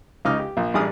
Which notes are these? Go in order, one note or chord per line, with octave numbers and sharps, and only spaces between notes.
C#2 C#3 D#4 D6 F6
G4
A#1
A1 G3 D4 G#4 D#6 F6